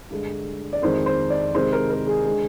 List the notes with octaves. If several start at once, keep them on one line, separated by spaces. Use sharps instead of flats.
G2 D3 G#3
D5
F2 D#3 G#3 C5
C5
D5
C3 D#3 G#3 C5
A#4
A#4
G#4
D3 G#3